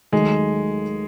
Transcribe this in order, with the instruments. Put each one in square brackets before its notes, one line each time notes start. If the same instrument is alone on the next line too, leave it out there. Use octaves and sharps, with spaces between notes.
[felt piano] D#2 D#3 F#3 A3 D#4 [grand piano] G#3